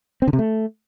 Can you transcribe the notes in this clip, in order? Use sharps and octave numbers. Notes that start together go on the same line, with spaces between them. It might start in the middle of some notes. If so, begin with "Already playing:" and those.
C4
D3
C3
A3